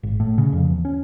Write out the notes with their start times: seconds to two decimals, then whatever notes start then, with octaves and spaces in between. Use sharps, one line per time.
0.03 G#1
0.20 A2
0.38 C#3
0.53 F2
0.70 E2
0.85 C#4